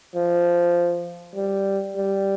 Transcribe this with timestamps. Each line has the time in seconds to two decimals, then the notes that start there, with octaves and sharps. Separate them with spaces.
0.15 F3
1.36 G3
1.96 G3